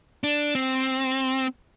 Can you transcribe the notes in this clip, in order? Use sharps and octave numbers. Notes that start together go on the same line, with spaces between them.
D4
C4